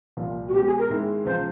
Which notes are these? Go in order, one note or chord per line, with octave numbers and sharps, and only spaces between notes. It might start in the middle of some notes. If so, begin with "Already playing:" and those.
C2 A#2 F3
F#4
B2 G#3 C4 G4
G#4
A#4
G#2 D#3 G#3 C4 E4
C#2 C3 F3 C5